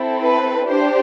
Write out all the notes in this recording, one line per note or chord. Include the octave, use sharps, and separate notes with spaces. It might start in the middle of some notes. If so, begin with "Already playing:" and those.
Already playing: C4 E4 A4
B4
D4 G4 C5